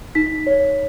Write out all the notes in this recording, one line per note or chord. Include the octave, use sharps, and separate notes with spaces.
D#4 B6
C#5